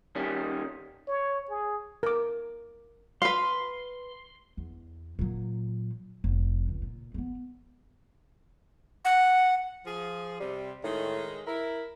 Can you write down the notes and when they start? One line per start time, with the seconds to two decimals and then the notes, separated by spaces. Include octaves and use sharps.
0.15 D#3 G3 C#4
1.08 C#5
1.50 G#4
2.03 A#4 D6
3.22 B4 F5 C6
4.57 E2
5.19 A#2 F#3
6.24 F1
6.68 C#2
6.82 A#2
7.14 A3 B3
9.05 F#5
9.86 F3 G#4
10.40 C3 G3
10.84 A2 D#3 G#3
11.47 E4 A#4